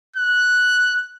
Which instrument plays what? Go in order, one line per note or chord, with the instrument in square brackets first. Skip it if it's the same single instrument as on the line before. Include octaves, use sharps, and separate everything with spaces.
[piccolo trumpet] F#6